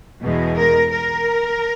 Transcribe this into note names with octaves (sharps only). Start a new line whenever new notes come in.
E2 B2 G#3
A#4
A#4